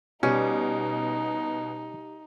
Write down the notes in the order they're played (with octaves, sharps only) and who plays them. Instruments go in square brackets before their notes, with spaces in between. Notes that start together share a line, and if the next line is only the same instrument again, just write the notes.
[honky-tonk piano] B2 [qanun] G3 [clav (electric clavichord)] C#4 [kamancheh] D#4